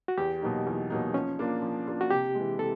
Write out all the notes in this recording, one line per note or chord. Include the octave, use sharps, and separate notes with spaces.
F#4
E2 G4
B2 F#3 A#3 D#4
E2
B2 F#3 A#3 D#4
F3 C#4
A#3 D4 F4
F3
A#3 D4 F4
F#4
C3 G4
E3 G#3
C3 A4